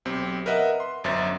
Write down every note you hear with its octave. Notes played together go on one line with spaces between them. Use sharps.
B1 C4 G4
A#4 B4 D#5 E5 F#5
C6
G1 F#2 C5 E5 A6